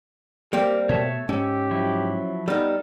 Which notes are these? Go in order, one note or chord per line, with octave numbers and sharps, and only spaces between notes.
G3 A#3 C4 G4 A#4
B2 A3 C#5 E5 A5
G#2 C#4 G4 E6
F3 F#3 E4
G3 B3 D#4 A4 F6